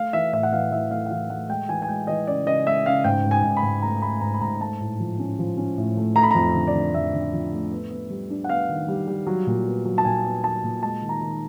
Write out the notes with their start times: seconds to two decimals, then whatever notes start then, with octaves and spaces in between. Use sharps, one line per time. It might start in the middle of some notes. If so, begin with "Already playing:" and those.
Already playing: A3 F5
0.13 E3 E5
0.33 A2 E5
0.43 F#5
0.53 E3 F5
0.71 E3 E5
0.91 A3 F5
1.06 F#5
1.11 E3 F5
1.30 A3 F#5
1.49 G#3 G5
1.68 E3 G#5
1.82 G#5
1.88 G#3 G5
2.07 E3 D#5
2.27 C#3 D5
2.46 C#3 D#5
2.66 G#3 E5
2.86 C#3 F5
3.04 G#2 G5
3.25 G#2
3.31 G#5
3.44 G#2
3.57 B5
3.63 G#2
3.82 A3 A#5
4.02 A3 B5
4.21 G#2 A#5
4.34 B5
4.41 G#2 A#5
4.60 A3 A5
4.80 A2
5.00 F3
5.19 C#4
5.39 F3
5.57 C#4
5.78 A2
5.97 A3
6.15 A3 A#5
6.23 B5
6.31 F2 A#5
6.54 D3
6.67 D5
6.75 D3
6.94 F2 E5
7.13 D3
7.33 F3
7.52 A3
7.72 B3
7.91 B3
8.10 G3
8.30 D4
8.44 F#5
8.49 B3 F5
8.69 D#3
8.88 G3
9.07 G3
9.27 F#3
9.47 A#2
9.66 B3
9.85 F#3
9.98 A5
10.05 A#2 G#5
10.25 B3
10.44 F#3 A5
10.64 A#2
10.83 G#3 A5
11.02 D#3
11.09 A#5
11.21 D#3